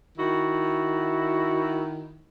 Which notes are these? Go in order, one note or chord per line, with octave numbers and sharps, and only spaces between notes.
D#3 E4 F#4